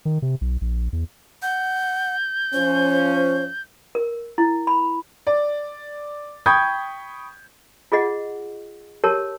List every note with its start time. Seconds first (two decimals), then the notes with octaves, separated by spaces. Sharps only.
0.05 D#3
0.22 C3
0.41 B1
0.61 A#1
0.93 E2
1.43 F#5 G6
2.54 F3 C#4 C5
3.95 A#4
4.38 E4
4.67 B5
5.27 D5
6.46 G5 B5 C#6 D#6 G6 G#6
7.92 F4 G#4 D#5 F#5
9.04 G4 A#4 C#5 A5